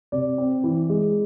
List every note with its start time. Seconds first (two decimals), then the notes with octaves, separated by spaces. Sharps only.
0.12 C3 D5
0.38 C4
0.64 E3
0.90 G#3